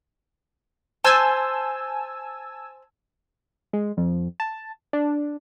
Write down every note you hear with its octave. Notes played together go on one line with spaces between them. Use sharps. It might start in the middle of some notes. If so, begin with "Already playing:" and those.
C5 G#5 A5 E6
G#3
F2
A5
D4